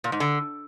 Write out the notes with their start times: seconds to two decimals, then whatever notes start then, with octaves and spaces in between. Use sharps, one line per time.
0.04 A#2
0.12 G#2
0.20 D3